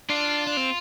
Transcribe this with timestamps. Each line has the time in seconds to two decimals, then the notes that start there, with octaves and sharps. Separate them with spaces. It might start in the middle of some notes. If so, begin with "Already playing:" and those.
0.10 D4 F4
0.47 D4
0.57 C4